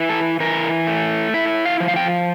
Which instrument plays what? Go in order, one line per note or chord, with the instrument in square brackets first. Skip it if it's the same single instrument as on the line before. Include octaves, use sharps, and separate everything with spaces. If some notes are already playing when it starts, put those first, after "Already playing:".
Already playing: [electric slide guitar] E3 E4
A4
E3 A#4
A3
E4 E5
F5
F3
F5
G5